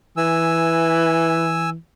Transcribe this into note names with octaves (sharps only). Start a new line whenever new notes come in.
E3 G#5 E6